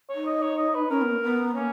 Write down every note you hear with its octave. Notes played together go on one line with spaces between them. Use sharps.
C#5
D#4
D#5
C#5
D#5
B4
C#4 A#4
B3
A#3
B3
A#3 C#4